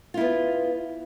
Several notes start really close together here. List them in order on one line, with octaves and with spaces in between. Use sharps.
F4 E4 B3